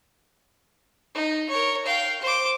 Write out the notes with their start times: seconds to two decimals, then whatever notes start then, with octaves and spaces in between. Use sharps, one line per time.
1.15 D#4
1.50 A#4 C#5
1.86 F5 G5
2.22 C5 D6